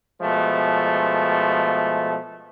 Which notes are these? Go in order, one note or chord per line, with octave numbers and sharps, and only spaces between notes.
B2 F3 G#3 A3